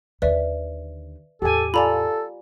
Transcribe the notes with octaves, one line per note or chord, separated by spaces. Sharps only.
D#2 D3 B4 D5 E5
E2 A2 G4 A4 G#5
F4 A4 D5 G#5 A#5 B5